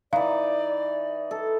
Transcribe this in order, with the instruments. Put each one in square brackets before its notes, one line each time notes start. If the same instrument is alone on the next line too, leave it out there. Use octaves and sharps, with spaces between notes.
[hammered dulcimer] E3 D#4 [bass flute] D5 [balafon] F5
[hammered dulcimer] A4